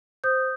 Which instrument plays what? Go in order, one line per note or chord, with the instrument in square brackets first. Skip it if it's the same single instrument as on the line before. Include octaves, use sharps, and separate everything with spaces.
[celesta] C5 D#6 G6